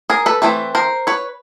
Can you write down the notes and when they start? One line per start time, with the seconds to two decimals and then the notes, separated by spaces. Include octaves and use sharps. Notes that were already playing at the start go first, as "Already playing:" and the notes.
0.10 G#4 A#4
0.26 A4 B4
0.42 E3 A3 C4 B4
0.75 A#4 C5
1.07 B4 C#5